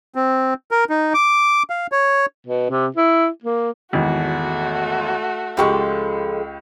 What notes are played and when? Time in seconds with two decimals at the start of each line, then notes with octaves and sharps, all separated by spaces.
0.15 C4
0.71 A#4
0.90 D#4
1.14 D6
1.70 F5
1.92 C#5
2.47 B2
2.70 C3
2.96 E4
3.44 A#3
3.93 G#1 E2 A3 F#4
5.57 C#2 F3 G#3 G4 A4 C#6